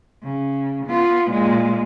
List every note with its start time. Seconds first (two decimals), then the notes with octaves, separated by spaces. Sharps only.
0.23 C#3
0.87 B3 F4
1.31 A#2 G#3